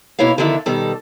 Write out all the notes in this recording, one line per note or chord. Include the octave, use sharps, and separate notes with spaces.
B2 A#3 E4 C#5 F5
D3 D#3 F3 D4 E4 E5
B2 D#3 G3 A4